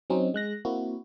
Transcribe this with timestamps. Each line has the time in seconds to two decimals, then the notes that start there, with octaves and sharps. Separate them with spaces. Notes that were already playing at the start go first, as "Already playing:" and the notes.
0.10 F#3 C4 C#4 D#4
0.34 G#3 F#6 A#6
0.65 A#3 C4 E4 F#4